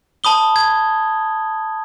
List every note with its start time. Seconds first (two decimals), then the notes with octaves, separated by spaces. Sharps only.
0.24 A5 B5 D#6 G7
0.56 G#6